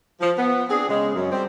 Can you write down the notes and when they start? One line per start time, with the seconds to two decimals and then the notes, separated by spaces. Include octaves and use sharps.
0.21 F3
0.38 B3
0.70 C4 D4 G#4
0.89 C#3 G#3
1.14 F#2
1.31 G3 C4